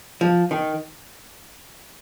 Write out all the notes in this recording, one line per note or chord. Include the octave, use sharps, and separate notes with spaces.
F3
D#3